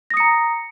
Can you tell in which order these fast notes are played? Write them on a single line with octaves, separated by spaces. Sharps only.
A#6 D#6 C#7 A#5